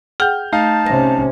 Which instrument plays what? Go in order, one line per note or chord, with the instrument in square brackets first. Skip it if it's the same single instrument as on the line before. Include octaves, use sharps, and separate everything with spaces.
[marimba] G#4 F#5 G5 [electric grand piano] F6 G6
[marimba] A3 [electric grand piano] D#4 F5 [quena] A5
[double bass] C3 C#4 [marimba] A#6